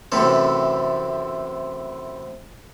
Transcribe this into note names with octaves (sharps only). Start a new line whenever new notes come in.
F#2 A2 C3 E3 A4